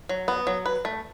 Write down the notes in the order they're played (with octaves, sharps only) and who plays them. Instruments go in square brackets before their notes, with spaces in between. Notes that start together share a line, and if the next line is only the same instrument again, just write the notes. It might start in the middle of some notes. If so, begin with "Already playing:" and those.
[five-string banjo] F#3
B3
F#3
B4
A3